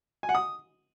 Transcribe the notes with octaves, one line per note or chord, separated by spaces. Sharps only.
G#5
F#5
D#6